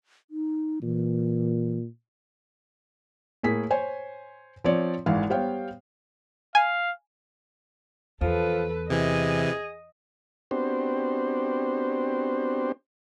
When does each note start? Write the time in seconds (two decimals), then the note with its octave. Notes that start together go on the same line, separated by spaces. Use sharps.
0.30 D#4
0.83 A#2 E3
3.43 A2 A#3 G#4 B6
3.71 C5 C#5 G#5
4.64 F3 C4 C#5 D5
5.06 G#1 G#2 E3 F5
5.30 G3 B3 C5 C#5 F5 G5
6.55 F5 G#5
8.21 E2 F3 A4 B4
8.90 C3 E3 G#4 D#5
10.51 B3 C4 D4 F#4 G4 C5